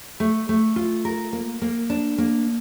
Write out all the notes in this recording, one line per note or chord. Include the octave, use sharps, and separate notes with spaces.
A3
A3
F4
A#4
A#3
A#3
D4
A#3